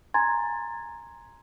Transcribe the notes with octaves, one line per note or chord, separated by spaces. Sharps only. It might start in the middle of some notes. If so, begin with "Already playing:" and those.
G#5 A#5 C6 G#6 A6